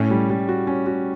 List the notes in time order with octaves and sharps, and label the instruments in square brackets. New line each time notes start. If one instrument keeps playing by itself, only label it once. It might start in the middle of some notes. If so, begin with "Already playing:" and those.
Already playing: [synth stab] A2 [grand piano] C#4
[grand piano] G3
G3
F#4
C#4
F#4